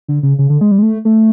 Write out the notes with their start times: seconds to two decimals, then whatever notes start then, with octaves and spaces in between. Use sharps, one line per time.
0.08 D3
0.23 C#3
0.39 C#3
0.50 D3
0.61 G#3
0.71 G3
0.78 G#3
0.83 A3
1.05 A3